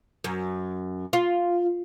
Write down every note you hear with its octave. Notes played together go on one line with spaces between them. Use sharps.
F#2
F4